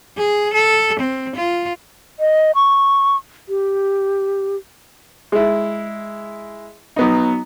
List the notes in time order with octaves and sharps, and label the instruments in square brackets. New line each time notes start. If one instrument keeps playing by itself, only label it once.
[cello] G#4
A4
C4
F4
[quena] D#5
C#6
G4
[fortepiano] G#3 E4
F#3 B3 D#4